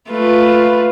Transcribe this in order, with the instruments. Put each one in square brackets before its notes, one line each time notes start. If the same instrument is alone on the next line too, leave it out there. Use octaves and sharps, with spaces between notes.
[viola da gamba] A3 F4 B4